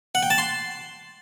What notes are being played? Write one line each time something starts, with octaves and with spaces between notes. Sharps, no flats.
F#5
G5
A5
C6